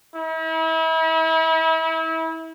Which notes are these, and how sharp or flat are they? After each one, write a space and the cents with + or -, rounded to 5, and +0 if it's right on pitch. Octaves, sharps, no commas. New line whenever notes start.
E4 -35